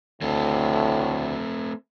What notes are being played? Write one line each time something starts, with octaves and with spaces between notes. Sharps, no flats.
D2 A2 A3 C4 A4